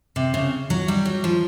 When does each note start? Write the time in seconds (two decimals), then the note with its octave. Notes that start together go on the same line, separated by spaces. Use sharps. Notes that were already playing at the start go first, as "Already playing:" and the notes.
0.16 C3
0.34 C#3
0.70 F#3
0.88 G3
1.05 F#3
1.24 F3